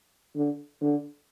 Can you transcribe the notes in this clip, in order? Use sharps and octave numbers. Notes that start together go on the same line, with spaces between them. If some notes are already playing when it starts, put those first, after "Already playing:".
D3
D3